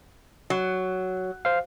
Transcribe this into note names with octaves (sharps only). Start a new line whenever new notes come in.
F#3
C5 F5